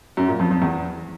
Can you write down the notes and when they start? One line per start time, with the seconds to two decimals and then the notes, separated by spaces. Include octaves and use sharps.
0.17 F#2
0.28 A#2
0.39 F2
0.51 F2
0.62 E2